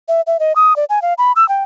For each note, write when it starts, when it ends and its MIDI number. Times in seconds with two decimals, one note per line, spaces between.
0.08 0.21 76
0.27 0.37 76
0.40 0.53 75
0.56 0.76 87
0.76 0.85 74
0.90 1.02 80
1.02 1.14 77
1.18 1.32 83
1.36 1.47 88
1.49 1.64 79